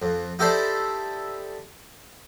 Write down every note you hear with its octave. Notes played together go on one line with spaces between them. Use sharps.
F2
D#4 E4 G4 A4 C5 D5